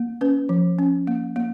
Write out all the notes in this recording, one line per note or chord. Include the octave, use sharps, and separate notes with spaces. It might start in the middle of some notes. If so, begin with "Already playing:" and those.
Already playing: A#3
C#4 B4
F3
C#4
A#3
A#3